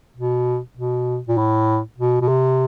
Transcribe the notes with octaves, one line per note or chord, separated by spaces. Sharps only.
B2
B2
A#2
A2
B2
B2
C3